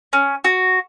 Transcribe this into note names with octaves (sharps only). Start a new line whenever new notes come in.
C#4
F#4